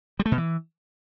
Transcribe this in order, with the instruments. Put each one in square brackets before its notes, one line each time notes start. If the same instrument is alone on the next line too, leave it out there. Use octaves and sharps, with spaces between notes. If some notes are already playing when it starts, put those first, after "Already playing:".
[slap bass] G3
A3
B2
E3